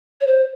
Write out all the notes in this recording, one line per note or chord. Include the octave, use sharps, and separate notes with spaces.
C#5
C5